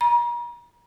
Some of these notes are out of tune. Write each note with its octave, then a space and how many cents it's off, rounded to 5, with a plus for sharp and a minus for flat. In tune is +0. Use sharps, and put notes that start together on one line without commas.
A#5 +40